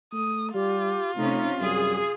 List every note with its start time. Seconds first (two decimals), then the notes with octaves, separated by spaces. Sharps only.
0.13 A3 D#6
0.54 G3 F4 G4
1.17 C3 A3 C#4 D#4
1.60 F#2 G3 G#4